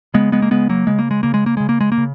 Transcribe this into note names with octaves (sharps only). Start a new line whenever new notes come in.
C#3 G#3 B3
G#3 B3
A#3
C#3 G#3 B3
F#3 A#3
C#3 G#3
A#3
G#3
C#3 A#3
G#3
A#3
C#3 G#3
A#3
G#3
A#3
C#3